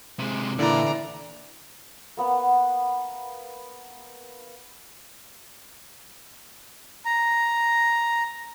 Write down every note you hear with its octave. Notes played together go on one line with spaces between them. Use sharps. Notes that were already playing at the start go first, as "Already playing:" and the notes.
C3 G#3
A#2 D3 E3 E4 D5 A#5
A#3 B3 F#5
A#5